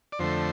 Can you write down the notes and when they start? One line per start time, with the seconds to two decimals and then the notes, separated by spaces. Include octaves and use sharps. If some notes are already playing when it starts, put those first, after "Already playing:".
0.12 D5
0.19 F2 D3 A3 C5